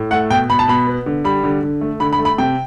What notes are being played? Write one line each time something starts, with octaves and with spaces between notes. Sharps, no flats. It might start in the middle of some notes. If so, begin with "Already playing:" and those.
Already playing: A2
A3 F#5
B2 G5
B2 B5
A5
B2 B5
B3
D3
G3 B5
D3
D3
A3
D3 B5
B5
A3
B5
C3 G5